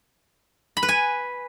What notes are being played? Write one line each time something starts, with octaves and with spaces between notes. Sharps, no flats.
B5
B4
G#5